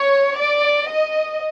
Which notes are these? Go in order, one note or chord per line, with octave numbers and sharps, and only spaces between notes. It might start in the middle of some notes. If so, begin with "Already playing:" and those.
Already playing: C#5
D5
D#5